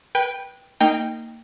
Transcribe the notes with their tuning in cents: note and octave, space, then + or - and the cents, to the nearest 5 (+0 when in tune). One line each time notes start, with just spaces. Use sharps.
B4 -20 G5 +0
A#3 -25 D#4 +0 G5 +0